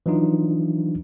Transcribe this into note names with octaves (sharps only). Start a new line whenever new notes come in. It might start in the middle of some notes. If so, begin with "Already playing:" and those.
E3 F#3 D4 D#4 F4